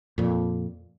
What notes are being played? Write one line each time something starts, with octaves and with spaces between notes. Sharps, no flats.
F2 A#2